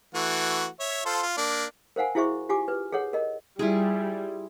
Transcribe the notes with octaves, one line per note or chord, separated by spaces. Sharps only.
E3 A3 F#4
C#5 E5
F4 A4 C5
F4
A#3 D4
A#4 C5 F5 F#5 G#5
E4 F#4 G#4 C5 E5 C#6
F4 G4 G#5 D6
B4
G#4 A4 C#5 F#5
A#4 D#5
G3 E4 F4 G#4